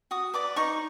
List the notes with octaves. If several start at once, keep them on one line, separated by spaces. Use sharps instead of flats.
F#4 D#6
B4 D5 D6
D#4 C#6